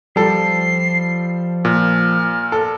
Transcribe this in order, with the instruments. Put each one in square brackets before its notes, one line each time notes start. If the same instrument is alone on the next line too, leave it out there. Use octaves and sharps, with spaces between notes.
[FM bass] F3 [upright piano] G3 A4 [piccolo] C7
[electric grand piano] A#2 [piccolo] F6
[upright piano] A4